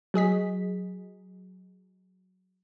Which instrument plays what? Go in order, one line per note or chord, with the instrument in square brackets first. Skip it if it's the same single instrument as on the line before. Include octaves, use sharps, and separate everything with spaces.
[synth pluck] F#3 G#4 D#5 B6